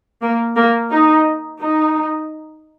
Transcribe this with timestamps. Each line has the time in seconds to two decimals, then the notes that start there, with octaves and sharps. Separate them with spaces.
0.22 A#3
0.56 A#3
0.91 D#4
1.60 D#4